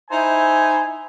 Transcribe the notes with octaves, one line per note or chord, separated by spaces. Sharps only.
D#4 E4 C5 G#5